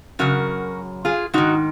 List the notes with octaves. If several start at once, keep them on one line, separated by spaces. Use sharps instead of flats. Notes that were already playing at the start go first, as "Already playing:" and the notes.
F#2 C#3 F#4 A#4
F4 G#4
G#2 D#3 D#4 F#4